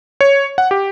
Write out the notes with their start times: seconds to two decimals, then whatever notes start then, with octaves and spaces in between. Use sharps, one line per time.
0.21 C#5
0.58 F#5
0.71 G4